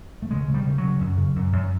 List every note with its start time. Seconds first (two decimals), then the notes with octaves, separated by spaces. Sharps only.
0.22 A3
0.31 C#3 G#3
0.48 C#3
0.54 G3
0.66 C#3
0.78 F#3
0.84 C#3
1.01 F#2
1.17 C#3
1.36 F#2
1.53 F#2